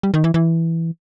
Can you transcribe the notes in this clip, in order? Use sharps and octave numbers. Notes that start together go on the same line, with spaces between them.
G3
D#3
E3
E3